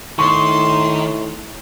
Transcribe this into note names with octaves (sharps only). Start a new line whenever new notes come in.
A2 D#3 C6 C#6